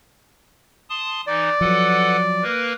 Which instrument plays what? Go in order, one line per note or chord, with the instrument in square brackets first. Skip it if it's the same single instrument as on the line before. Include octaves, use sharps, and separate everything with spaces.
[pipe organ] A5 C6 D#6
[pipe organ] E3 D#4 [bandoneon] D5
[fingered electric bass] F3 F#3 [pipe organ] A4 B4 F#5
[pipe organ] A#3 A#4 B4